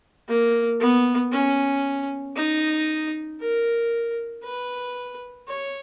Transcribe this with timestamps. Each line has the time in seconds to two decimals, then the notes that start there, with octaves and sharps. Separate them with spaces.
0.28 A#3
0.80 B3
1.32 C#4
2.36 D#4
3.40 A#4
4.44 B4
5.48 C#5